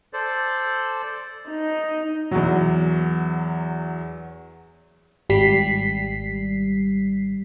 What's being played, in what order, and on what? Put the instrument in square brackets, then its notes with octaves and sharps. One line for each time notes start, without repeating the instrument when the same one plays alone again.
[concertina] A4 C5 D5
[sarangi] D#4
[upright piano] E2 F#3
[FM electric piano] G#1 G3 B6 C7